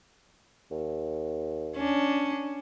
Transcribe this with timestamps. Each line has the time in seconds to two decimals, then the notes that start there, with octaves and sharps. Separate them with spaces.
0.71 D#2
1.77 C#4 D4